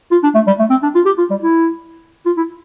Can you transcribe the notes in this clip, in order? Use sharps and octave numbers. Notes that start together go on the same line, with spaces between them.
F4
D4
A3
G3
A3
C4
D4
F4
G4
F4
G3
E4
F4
E4